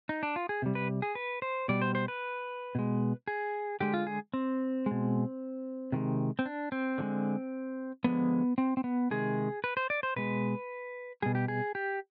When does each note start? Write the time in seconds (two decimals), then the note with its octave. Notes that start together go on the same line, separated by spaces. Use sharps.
0.09 D#4
0.23 D4
0.36 F4
0.49 G#4
0.62 C3 G3
0.75 B4
1.02 G#4
1.15 B4
1.42 C5
1.68 B2 G3 D5
1.82 C5
1.95 C5
2.08 B4
2.75 B2 G#3
3.28 G#4
3.80 D3 G#3 G4
3.94 F4
4.07 G#4
4.33 C4
4.86 B2 G#3
5.92 C3 D#3 G#3
6.39 C4
6.46 D4
6.72 C4
6.98 D3 F3 G#3
8.04 D3 F3 G#3 B3
8.58 C4
8.77 C4
8.84 B3
9.11 C3 D#3 G#3 G#4
9.64 B4
9.77 C5
9.90 D5
10.03 C5
10.16 B2 G#3 B4
11.22 B2 G3 G#4
11.35 G4
11.48 G#4
11.75 G4